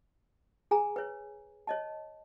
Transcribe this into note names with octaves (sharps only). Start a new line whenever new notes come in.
G#4 G#5 A#5
B4 C#5
C#5 D#5 A5